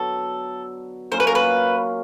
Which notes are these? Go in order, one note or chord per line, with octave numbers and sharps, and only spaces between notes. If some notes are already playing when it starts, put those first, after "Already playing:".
Already playing: D3 F#3 B3 A4
F#3 A#3 C#4 F4 C5
B4
A#4
B4